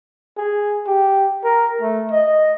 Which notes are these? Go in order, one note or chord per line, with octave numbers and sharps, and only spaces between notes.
G#4
G4
A#4
A3
D#5